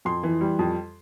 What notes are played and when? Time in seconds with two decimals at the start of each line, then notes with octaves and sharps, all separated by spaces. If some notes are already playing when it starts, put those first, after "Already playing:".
0.05 F2 C6
0.23 E3
0.41 G3
0.59 F2